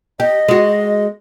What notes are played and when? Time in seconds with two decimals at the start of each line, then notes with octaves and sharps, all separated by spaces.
0.20 G4 D#5
0.48 G#3 F#4